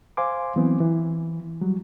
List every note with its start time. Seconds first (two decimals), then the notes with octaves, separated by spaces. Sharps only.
0.17 C5 F5 G#5 C6 D6
0.56 E3 F#3 B3 C4
0.80 E3
1.61 F#3 G3